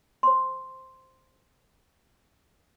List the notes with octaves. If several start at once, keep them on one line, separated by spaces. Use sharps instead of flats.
C5 C6